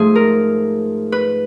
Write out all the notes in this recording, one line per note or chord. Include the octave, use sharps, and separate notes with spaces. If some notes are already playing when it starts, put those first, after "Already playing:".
Already playing: G#2 F3 A3 G#4
A#4
B4